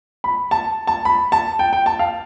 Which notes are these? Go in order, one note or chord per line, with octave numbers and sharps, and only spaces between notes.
B5
A5
A5
B5
A5
G5
G5
A5
F5